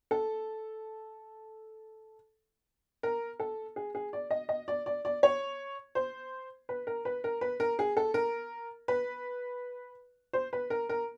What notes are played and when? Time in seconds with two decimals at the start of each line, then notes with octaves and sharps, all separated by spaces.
0.11 A4
3.03 A#4
3.40 A4
3.76 G#4
3.95 G#4
4.13 D5
4.31 D#5
4.49 D#5
4.68 D5
4.86 D5
5.05 D5
5.23 C#5
5.95 C5
6.69 B4
6.87 A#4
7.05 B4
7.24 A#4
7.41 B4
7.60 A#4
7.79 G#4
7.97 A4
8.14 A#4
8.88 B4
10.33 C5
10.53 B4
10.70 A#4
10.89 A#4